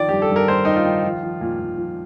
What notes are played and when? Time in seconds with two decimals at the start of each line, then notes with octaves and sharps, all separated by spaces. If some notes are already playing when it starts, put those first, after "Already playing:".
Already playing: D#3 F3 D5
0.09 G2 G4
0.22 A4
0.30 G2
0.36 A#4
0.48 D#3 C5
0.65 D#3 D#4
0.76 F4
0.86 D#3
1.04 F3
1.22 F3
1.41 A#2
1.59 A#2
1.78 F3